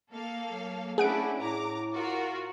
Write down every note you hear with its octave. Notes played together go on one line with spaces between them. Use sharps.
A#3 A4 F5
F#3
A3 C#4 D4 E4 G#4 F#5 D7
A2 A#5 D6
F4 F#4 A#4